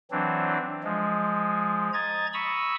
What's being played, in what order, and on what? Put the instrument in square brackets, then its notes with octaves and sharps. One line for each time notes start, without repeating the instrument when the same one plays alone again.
[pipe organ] E3 F#3 C4 D4
F3 G#3
D#5 A#5 G#6 A6
A#5 B5 C#6 D#6 E6